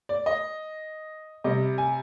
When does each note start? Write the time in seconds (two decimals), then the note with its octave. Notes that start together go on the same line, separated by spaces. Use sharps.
0.09 D5
0.26 D#5
1.44 C3 G3 D#5
1.78 G#5